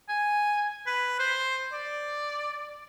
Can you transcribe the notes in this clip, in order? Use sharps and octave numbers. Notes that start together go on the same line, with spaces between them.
G#5
B4
C5
D5